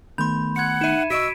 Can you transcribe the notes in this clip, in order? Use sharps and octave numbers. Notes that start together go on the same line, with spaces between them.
D#3 A3 B3 B5 C6 G6
F#5 G#6 C#7
D#4 E5 D#7 E7
C2 F#4 D#5 C#6 E6 B6 D7